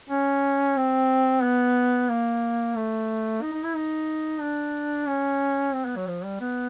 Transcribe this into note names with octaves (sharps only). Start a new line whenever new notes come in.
C#4
C4
B3
A#3
A3
D#4
D#4
E4
D#4
D4
C#4
C4
B3
F#3
F3
G3
B3